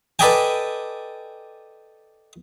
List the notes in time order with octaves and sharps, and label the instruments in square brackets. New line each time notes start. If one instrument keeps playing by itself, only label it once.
[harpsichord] A4 B4 D5 D#5 G5 G#5